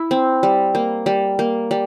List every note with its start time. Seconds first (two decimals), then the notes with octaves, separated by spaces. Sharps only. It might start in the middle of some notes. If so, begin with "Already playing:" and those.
Already playing: E4
0.11 C4
0.43 G3
0.75 A#3
1.06 G3
1.39 A#3
1.71 G3